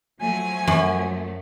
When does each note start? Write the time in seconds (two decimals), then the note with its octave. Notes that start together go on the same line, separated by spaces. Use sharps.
0.21 F3 F#3 A3 G#5
0.67 F#2